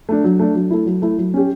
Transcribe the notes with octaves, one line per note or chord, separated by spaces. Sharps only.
A3 D4
F#3
A3 D4
F#3
A3 E4
F#3
A3 E4
F#3
C#4 G4